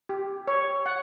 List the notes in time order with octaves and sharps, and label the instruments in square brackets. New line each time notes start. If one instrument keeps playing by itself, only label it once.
[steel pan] G4
C#5
F#5